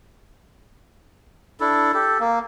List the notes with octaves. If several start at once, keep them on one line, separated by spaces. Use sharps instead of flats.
D4 E4 A4
G4 A4
A#3